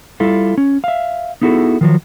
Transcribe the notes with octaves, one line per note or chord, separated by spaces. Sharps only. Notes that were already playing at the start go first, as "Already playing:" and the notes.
G3 E4 F4 A4
C#4
E5 F5
B3 D#4 E4 F#4 G#4 A4
D#3 F3 F#3